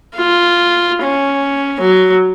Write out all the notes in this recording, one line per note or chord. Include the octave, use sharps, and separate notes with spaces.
F4
C#4
F#3